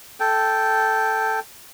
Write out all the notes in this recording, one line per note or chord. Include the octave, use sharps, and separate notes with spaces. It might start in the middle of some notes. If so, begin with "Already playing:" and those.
A4 G5